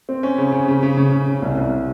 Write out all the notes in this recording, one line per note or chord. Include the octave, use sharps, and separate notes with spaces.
C4
C#4
C#3
C#3
C#3
C#3
C#3
C#3
C#3
C2
C2